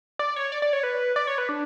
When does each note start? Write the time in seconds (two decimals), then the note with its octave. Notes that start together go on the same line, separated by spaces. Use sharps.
0.19 D5
0.36 C#5
0.52 D5
0.62 D5
0.73 C#5
0.83 B4
1.16 D5
1.27 C#5
1.38 B4
1.49 D4